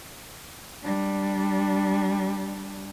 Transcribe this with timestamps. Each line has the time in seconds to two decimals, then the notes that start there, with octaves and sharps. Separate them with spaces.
0.83 G3 D4